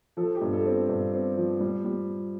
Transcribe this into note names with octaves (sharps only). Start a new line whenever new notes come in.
F3 A4
G4
G2
A4
C4
G2
C4
F3
G3
G3